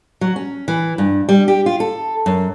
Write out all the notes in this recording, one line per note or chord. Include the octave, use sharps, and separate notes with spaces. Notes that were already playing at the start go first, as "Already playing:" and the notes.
F#3
C#4
E3
G2
G3
G4
F4
A4
F#2